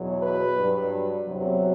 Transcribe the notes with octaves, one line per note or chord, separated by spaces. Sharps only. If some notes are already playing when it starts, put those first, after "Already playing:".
Already playing: E2 B2 F#3
B4
G2 F#3
E2 C3 F#3